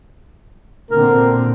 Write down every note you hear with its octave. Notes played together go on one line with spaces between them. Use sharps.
A#2 D3 C4 A#4